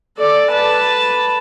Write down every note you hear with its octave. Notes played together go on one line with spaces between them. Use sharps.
A4 D5
B4 A5